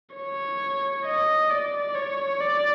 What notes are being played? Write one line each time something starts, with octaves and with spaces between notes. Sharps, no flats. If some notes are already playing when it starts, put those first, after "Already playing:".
C#5
D#5
D5
C#5
D5